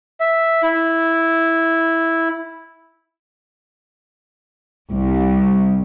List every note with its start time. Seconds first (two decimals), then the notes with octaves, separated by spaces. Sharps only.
0.20 E5
0.63 E4
4.91 C2